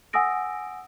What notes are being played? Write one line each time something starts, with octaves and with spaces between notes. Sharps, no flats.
F#5 G#5 D#6 E6 A#6 D7